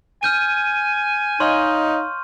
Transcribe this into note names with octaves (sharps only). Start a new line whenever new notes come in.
G#5 F6 G6 D#7
D#4 C#5 D#5 F5 C6 C#6 F6